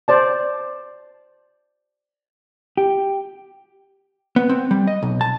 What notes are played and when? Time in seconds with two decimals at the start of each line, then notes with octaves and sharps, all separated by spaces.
0.08 C5 D5 A5
2.77 G4
4.36 B3
4.49 C4
4.71 G3
4.87 D#5
5.03 B1
5.21 A5